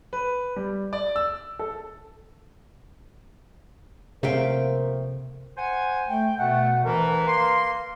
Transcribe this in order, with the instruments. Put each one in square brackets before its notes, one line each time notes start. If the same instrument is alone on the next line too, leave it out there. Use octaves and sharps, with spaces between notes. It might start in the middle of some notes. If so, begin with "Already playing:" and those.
[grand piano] B4
G3
D5
E6
A4
[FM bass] C3 [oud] F3 A3 A#3 [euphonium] A#4 [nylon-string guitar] E5 F5 G5
[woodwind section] C5 F#5 G#5
[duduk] A3 [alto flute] G5
[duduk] B2 [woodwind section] A3 [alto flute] F#5
[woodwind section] D2 E3 [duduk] A#4 [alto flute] B4
[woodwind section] A#3 C6